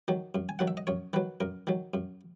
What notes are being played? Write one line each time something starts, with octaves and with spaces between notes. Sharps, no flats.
D#3 F#3
F#2
G#5
D#3 F#3 F#5
E5
D#5
F#2 C#5
D#3 F#3 B4
F#2 A#4
D#3 F#3
F#2